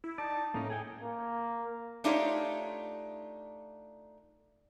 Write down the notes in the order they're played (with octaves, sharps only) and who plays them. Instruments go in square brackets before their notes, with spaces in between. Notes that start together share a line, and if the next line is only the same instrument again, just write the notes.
[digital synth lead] E4
[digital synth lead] D#4 [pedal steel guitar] D5 [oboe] A5
[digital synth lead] A2 [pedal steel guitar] A#3 C#4 [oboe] D#4
[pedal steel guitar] G#4 A4 G5 [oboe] G#5
[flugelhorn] A#3
[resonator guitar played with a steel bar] A3 D4 D#4 F4 G4 C#5